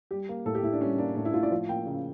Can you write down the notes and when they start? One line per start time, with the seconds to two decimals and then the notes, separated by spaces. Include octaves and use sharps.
0.11 G3 G4
0.29 A#3
0.46 A2 A4
0.55 G4
0.63 A2 E4
0.73 D4
0.81 G3 C#4
0.98 A#3 D4
1.16 A2 D4
1.25 E4
1.34 A2 F4
1.43 D5
1.51 F3
1.69 A#3 G5
1.86 C#3